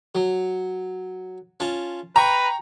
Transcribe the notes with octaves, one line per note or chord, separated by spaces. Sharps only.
F#3
C#4 F4 A5
B4 G5 A#5 C#6